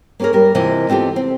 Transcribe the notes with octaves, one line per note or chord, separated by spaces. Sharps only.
A#3 C#4 G4 G#4 A#4
G3 G4 A#4
C3 E3 F4 D#5
B3 C4 F4 G4 A4
C4